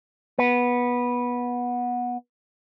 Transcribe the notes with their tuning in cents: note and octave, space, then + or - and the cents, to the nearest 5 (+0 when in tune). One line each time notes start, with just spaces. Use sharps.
B3 -15